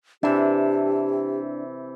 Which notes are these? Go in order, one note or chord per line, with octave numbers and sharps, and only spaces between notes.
C3 E3 D4 G4